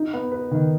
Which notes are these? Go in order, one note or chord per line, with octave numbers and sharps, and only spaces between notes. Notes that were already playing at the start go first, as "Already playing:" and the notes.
Already playing: D#4
B3
B4
D#3